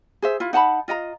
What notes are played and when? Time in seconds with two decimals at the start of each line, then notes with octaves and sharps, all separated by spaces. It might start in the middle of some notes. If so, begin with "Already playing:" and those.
0.22 G#4 C5 E5
0.40 E4 F4
0.53 D#4 F#5 A5 B5
0.88 F4 D#5 F#5 A#5